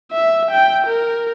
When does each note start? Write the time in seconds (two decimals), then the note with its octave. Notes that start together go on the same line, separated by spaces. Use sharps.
0.12 E5
0.51 G5
0.87 A#4